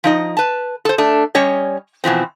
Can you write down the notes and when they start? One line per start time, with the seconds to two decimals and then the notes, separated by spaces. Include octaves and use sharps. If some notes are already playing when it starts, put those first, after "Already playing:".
0.04 F3 D#4 D#5
0.37 B4 A5
0.85 A4 C5
0.98 A3 D4
1.35 G3 C#4 C#5 D#5
2.04 B2 E3 F3 C4